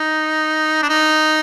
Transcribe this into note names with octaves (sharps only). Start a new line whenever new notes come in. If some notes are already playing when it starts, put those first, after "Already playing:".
Already playing: D#4
D4
D#4